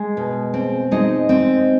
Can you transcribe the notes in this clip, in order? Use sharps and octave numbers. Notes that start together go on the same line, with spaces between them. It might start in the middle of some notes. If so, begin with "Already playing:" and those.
Already playing: G#3
B2
C4
G#3 D#4 D#5
C4